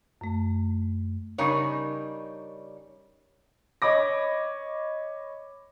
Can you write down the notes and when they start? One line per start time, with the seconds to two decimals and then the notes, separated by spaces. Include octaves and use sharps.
0.21 F#2 A3
1.38 C#3 G3 D4 D#4 A#4 C#5
3.82 C#5 D#5 B5 D6 A#6